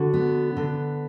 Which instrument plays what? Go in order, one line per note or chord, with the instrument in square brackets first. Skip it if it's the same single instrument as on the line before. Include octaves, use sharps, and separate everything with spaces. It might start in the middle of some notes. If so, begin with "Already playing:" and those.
Already playing: [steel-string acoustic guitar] D3 F#4
B3
D3